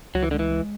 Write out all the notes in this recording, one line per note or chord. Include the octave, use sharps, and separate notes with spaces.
C#2 F#3
E3
D3 G#3
E3
G#3